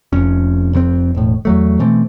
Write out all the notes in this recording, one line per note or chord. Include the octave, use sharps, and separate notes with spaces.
F1 F2 C#4
F1 F2 B2 C4
E1 A2
E2 F#3 A3
B2 E3 A3 C4